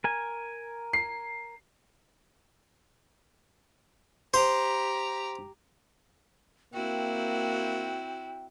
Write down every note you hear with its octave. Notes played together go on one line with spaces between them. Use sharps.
A#4 G#5
C7
G4 C5 A#5
A#3 C4 E4 F#4 G5